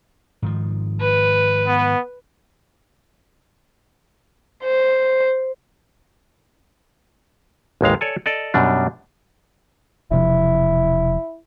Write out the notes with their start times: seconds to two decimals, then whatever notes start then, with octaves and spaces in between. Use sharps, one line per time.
0.42 G#2 D#3 F3
1.01 B4
1.67 B3
4.64 C5
7.81 A1 D#2 G#3 F5
8.01 A4 C#5 D5 G#5
8.26 A4 D5 D#5
8.54 F#2 B2 G3 D4
10.11 E1 C3 F3 E4